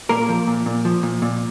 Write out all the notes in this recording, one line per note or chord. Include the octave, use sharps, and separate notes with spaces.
A#2 A#3 A#4
F3
A#2
A#2
F3
A#2
A#2